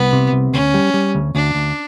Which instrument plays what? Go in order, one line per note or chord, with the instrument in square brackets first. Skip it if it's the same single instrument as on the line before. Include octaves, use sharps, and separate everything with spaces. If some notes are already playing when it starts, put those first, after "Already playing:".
Already playing: [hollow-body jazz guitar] C2 [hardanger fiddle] B3
[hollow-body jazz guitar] C3
C2
[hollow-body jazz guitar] D2 [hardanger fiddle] C#4
[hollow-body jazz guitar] G3
G3
D2
[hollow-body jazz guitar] D2 [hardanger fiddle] D4
[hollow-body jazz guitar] D2